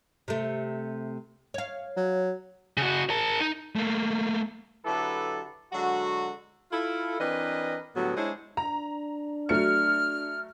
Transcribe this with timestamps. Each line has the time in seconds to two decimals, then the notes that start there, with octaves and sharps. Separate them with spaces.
0.28 C3 A3
1.54 C#5 F5
1.97 F#3
2.77 C#3 F#4
3.10 A#4 A5
3.40 D#4
3.76 A3 A#3
4.85 D3 F#3 E4 G4 A4 B4
5.72 D3 F#3 G#3 F#4
6.72 E4 F4 A4
7.20 E3 C4 D4 A#4 B4 D#5
7.95 A2 D3 F#3 G3 B3
8.16 G#3 D4 E4 C5 C#5 D#5
8.57 D4 A#5
9.49 F#3 A3 F6 C#7